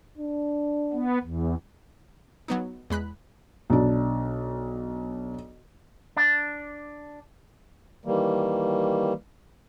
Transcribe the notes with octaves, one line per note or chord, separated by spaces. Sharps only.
D4
B3
E2
F#3 B3 D#4
E2 G#3 B5 F#6
B1 D4
D4
D#3 E3 G3 A#3